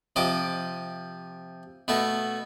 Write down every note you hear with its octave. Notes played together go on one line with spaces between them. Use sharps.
C3 F3 D#5 D6
B2 A3 F#4